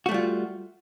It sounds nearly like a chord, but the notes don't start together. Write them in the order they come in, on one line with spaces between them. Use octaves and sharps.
F#4 A3 G3 F4